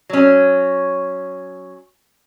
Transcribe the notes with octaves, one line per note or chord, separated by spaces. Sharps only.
F#3 C#4